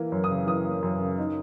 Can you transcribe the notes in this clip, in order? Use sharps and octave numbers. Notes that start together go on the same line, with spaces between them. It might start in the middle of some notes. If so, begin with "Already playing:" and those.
Already playing: E3 A#3
F#2
D#6
C#3
E3 D#6
A#3
F#2
C#3
D#4